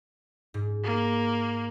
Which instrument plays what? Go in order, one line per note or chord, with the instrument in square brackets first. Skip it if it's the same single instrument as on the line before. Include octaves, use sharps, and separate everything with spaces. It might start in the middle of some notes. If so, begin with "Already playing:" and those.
[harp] G#2
[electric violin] A#3